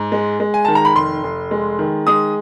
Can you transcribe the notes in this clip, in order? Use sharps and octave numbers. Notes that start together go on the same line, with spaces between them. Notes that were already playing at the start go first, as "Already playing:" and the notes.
Already playing: G#2
G#3
G#3
G#5
D#3 A5
A#5
B5
F1 C6
F1
G#3
D#3
G#3 D#6